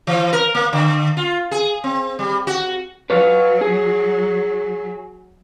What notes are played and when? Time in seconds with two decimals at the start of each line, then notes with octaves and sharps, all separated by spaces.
0.07 E3
0.33 A#4
0.55 A#3
0.73 D3
1.17 F4
1.51 G#4
1.84 C4
2.19 G3
2.47 F#4
3.10 F#3 B4 C#5 F5
3.61 G#4